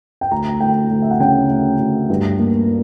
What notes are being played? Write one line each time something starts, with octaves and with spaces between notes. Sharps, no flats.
G5
D2 A#5
D2 G5
D2
E5
F#5
C#3 G5
D2
D2
G2
A#3